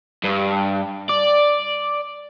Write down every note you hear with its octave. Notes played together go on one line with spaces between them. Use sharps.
G2
D5